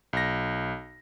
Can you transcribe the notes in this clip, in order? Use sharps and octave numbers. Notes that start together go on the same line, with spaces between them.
B1 A#6